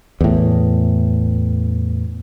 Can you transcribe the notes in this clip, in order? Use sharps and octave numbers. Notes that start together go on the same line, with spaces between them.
E2 A2